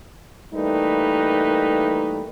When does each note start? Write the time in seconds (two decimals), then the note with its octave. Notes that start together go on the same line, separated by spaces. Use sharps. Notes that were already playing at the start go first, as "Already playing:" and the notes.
0.54 E3 G3 A3 A#3 D#4 B4